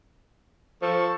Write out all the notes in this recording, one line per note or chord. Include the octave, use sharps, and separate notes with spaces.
F3 A4 C5 C#6